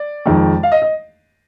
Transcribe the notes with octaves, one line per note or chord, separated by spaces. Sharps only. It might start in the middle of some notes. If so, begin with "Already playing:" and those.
Already playing: D5
F2 D#3 G#3
F5
D#5
D#5